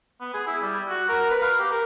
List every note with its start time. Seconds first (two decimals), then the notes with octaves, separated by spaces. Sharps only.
0.21 B3
0.34 G#4
0.47 E4
0.62 G3
0.90 F#4
1.09 A#4
1.30 B4
1.42 F5
1.59 G4
1.71 A#4